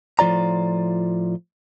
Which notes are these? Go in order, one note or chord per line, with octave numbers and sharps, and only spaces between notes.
A2 F3 F4 D5 A#5